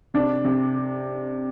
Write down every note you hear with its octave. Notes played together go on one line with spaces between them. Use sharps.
C3 D4
C3